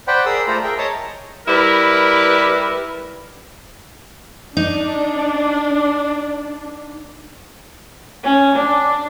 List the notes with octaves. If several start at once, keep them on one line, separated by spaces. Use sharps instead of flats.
C5 D5 F#5 G5 B5
G#4 A#4 D5 D#6 E6
A3 F4 A4 C5 A#5 B5
G#4 A#4 E5 G5
C#5 D#5 A5 A#5 C#6 D#6
G3 E4 A#4 B4
D4 D#4
C#4
D4